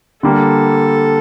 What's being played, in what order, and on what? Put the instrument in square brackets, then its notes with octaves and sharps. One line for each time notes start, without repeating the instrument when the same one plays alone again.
[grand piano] D3 G3 A#3 [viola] A4